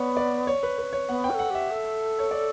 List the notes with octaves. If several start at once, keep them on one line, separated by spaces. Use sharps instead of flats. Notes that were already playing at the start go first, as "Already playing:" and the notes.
Already playing: B3 C#5 D5 F#5
D5
C#5
B4
B4
C#5
B3 F#5
G5
B4
A4
F#5
G4 E5
A4
C#5
D5